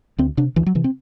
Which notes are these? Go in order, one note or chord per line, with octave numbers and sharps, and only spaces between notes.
D2 C4
C3 D4
D2 E3
F#3
C3 E3
C4